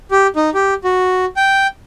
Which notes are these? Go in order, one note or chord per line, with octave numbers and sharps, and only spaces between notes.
G4
D#4
G4
F#4
G5